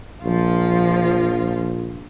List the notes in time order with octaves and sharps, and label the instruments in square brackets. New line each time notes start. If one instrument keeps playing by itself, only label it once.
[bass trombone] A#1 [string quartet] F3 F4